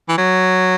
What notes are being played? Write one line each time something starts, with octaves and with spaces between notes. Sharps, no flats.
E3
F#3